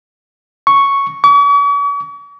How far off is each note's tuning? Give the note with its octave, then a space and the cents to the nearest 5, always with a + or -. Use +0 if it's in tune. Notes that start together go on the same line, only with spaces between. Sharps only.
C#6 +0
C#6 +45